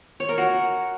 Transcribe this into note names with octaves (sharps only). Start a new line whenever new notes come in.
C#5
A#4
F#4